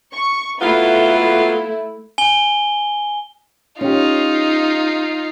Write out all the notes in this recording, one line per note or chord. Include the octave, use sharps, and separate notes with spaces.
C#6
F#3 A3 B3 E4 F4
G#5 G7
C#4 D#4 F4 G4